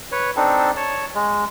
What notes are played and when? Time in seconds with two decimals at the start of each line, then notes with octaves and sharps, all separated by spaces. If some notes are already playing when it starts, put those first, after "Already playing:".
0.12 B4 C#5
0.36 C4 D4 D#4 A4
0.77 C#5 A5
1.15 G#3